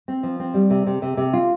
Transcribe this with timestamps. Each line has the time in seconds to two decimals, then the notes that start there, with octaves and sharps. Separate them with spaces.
0.08 C4
0.23 F3
0.40 C4
0.54 G3
0.70 C3
0.87 C3
1.02 C3
1.17 C3
1.33 F4